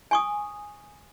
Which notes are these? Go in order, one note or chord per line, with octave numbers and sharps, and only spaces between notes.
G#5 C#6 D#6